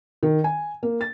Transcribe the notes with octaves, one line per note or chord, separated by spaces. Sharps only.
D#3
G#5
A#3
A6